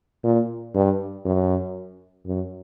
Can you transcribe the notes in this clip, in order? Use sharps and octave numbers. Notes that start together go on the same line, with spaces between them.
A#2
G2
F#2
F#2